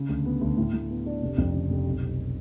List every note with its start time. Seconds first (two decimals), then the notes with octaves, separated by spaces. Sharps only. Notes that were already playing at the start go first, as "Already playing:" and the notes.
Already playing: C#3
0.09 D2
0.25 B3
0.41 D2
0.57 A2
0.73 A2
0.90 B3
1.06 D4
1.22 F1
1.38 F2
1.54 C#3
1.70 F1
1.86 B1
2.02 B1